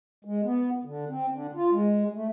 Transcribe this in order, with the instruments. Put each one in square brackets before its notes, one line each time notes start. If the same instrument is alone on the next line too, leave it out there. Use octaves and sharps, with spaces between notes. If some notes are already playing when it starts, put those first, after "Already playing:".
[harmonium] G#3
B3
D3
C4
D3
F4
G#3
A3